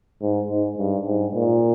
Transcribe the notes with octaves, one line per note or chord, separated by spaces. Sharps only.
G#2
G#2
G2
G#2
A#2